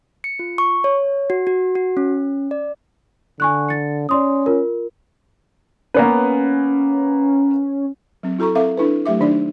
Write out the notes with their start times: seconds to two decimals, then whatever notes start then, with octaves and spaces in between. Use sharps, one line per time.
0.24 C#7
0.39 F4
0.58 C#6
0.84 C#5
1.30 F#4
1.47 F#4
1.75 F#4
1.97 C#4
2.51 D5
3.40 D3 G#5 C#6 F#6
3.69 A6 C#7
4.09 C#4 D5 C6 D#6
4.46 F4 A#4
5.94 A#3 B3 C#4 B4
8.23 F#3 C4
8.39 E4 F#4 A4 A#5 C#6
8.55 C4 A4 A#4 E5 F5 D6
8.77 D4 E4 A4 B4
9.06 F#3 A3 G4 E5 D6
9.20 D#3 D4 D#4 D5